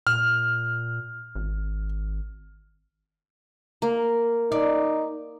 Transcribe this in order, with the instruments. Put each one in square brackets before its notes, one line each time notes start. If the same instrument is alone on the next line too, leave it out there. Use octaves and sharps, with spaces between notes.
[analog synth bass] A#2 [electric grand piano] F6
[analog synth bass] G#1
[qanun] A#3
[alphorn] D#4 [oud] D5